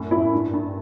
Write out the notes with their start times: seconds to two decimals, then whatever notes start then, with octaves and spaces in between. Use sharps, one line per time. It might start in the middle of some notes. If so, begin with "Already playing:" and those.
Already playing: F#2 A2
0.11 F#2 E4
0.33 G2
0.53 G2